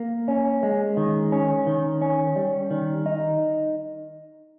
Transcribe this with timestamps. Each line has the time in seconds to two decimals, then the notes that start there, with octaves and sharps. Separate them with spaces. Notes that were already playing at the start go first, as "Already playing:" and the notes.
Already playing: A#3
0.28 C#4
0.63 G#3
0.97 D#3
1.32 C#4
1.67 D#3
2.02 C#4
2.36 G3
2.71 D#3
3.06 D#4